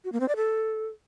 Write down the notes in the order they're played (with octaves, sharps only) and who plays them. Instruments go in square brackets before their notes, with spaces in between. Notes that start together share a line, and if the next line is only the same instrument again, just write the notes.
[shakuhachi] F#4
A#3
C4
D5
A4